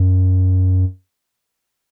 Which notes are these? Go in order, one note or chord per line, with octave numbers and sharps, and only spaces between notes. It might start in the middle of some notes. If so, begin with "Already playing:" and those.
Already playing: F#2